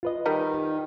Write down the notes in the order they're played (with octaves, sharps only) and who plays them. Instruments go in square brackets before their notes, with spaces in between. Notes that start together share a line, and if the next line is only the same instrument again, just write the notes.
[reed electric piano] F4 B4 D#5
[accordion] D#3 [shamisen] G3 D#4 A#4